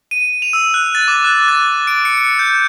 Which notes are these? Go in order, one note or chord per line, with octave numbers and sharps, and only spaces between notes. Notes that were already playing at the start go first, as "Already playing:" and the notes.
D#7
F7
E6
F#6
A6
D6
F#6
A6
D7
C#7
C#7
G6